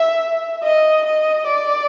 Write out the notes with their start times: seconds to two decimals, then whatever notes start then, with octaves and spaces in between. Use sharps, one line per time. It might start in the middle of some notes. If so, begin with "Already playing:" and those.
Already playing: E5
0.63 D#5
1.05 D#5
1.47 D5